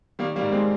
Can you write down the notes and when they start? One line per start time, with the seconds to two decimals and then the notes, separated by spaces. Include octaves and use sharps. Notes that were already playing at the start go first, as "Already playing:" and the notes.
0.19 D#3 G3 A#3
0.36 G3 A#3
0.42 G#2
0.52 G#3 C4